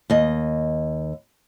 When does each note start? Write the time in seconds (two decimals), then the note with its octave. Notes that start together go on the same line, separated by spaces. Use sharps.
0.10 D#2 D#5